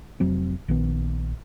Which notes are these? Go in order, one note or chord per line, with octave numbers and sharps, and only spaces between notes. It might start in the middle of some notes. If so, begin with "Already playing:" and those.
F1 F#3 C4
A#1 D#3 B3